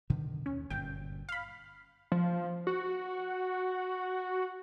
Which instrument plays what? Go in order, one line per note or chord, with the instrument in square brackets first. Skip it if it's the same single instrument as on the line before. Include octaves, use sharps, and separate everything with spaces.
[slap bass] B2 D3 D#3
[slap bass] D#2 [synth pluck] C#4
[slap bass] G1 F#2 A#2 [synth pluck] G5
[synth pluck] F5 B5
[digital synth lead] F3
F#4